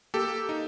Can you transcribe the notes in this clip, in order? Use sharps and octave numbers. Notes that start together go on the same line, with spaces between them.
A#3 G4 A4
D#4